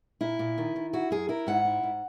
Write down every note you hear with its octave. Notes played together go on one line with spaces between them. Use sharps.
A#2 E4
A#2
D#3
D#3
E4 F#4
F#2 G#4
E4 A#4
G#2 F#5
E4
G#2